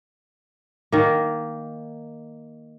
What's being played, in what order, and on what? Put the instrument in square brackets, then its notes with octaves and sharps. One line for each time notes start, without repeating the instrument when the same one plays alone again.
[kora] D#3 A#3